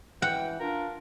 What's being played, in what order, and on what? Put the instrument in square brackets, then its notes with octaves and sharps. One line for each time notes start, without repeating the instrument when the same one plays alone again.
[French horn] E3 [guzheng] F#5 [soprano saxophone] G5
[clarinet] D4 [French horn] F4 [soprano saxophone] A#4